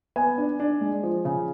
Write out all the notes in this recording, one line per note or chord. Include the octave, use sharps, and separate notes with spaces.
B3 G#5
D4
D4
G#3
F3
C#3